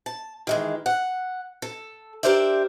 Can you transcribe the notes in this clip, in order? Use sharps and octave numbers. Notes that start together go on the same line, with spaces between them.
A5
D#3 E3 G#3
F#5
A4
D4 G4 A#4 C5 D5 E5